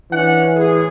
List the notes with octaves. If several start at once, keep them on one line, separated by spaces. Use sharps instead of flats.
E3 C#4 D4 F#5
E2 A2 G#4